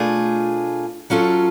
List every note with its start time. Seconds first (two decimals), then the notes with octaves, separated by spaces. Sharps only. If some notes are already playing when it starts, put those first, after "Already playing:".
Already playing: B2 A3 D4 F4 G#4
1.10 F#3 C#4 F4 A4